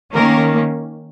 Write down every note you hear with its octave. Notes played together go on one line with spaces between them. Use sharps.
D#3 A#3 C#4 A#4